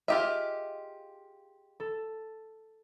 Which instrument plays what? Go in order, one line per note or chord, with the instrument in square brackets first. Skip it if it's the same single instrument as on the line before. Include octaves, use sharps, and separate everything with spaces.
[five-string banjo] F4 G4 E5 [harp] G#4 D#5
[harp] A4